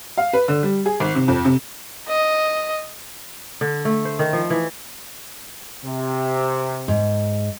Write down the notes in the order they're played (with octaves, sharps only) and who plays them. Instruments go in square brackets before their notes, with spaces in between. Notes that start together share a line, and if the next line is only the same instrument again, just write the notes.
[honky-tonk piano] F5
B4
D3
G3
G#4
G#1
C3
F2
C3
[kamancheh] D#5
[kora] D3
A3
C5
D#3
F3
E3
[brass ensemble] C3
[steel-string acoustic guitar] G#2